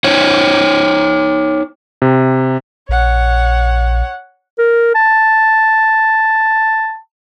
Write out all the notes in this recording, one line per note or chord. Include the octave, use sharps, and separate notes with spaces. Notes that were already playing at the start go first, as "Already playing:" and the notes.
D#4 C5 C#5
C3
A#1 C#5 F#5
A#4
A5